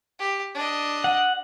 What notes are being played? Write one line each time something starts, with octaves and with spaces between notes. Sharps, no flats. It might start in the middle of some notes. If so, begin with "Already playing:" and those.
G4
D4 D#5
F#5